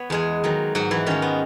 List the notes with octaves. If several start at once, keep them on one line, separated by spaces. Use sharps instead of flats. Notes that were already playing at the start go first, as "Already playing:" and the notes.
Already playing: B3 B4 C#5
E2 G#3 G#4
D#3 F#3
G#2 F#3 F#4
E3 E4
D#3 G#3 C#4
B3